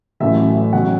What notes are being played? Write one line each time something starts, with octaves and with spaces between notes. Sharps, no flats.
A1 A2 F#3 E5
E2 B2 F#3 F#5